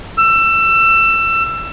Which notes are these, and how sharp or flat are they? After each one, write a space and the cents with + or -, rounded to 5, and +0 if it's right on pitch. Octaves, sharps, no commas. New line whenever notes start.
E6 +25